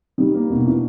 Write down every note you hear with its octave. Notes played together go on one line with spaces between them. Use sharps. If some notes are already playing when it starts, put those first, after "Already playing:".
D#3 G3
A#3
B2 D#3
E3 D4